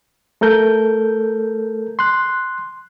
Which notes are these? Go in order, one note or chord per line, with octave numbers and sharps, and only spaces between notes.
A3 A4 A#4 G6
C6 F#6